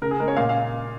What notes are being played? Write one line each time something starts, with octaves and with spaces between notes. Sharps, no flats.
C#3 A#4
G#4
G#3 A#4
C#5
A#2 F5
F5